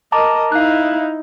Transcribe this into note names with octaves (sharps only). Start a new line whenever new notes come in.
A#4 D#5 A5 A#5 D6
D#4 E4 F5 F#6